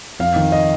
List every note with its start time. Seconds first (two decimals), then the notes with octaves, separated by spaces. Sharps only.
0.19 F2 F5
0.36 D#3
0.52 D#5